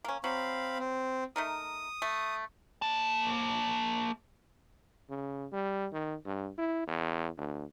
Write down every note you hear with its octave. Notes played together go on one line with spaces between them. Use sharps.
A#3 C#4
F#3 C4 F5 B5
C4
A3 D#4 A#4 D#6
A3
A#3 A5
C#3
G3
D#3
G2
E4
E2
D2